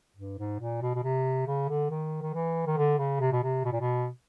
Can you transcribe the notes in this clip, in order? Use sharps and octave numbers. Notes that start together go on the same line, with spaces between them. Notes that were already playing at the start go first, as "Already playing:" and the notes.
G2
G#2
A#2
B2
B2
C3
C#3
D3
D#3
D#3
E3
D#3
D3
C#3
C3
B2
C3
B2
A#2
B2